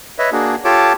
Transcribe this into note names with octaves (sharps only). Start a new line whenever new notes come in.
B4 C#5 D#5 E5
A#3 D4 F#4 G#4
F4 G4 A4 C#5 A5 D6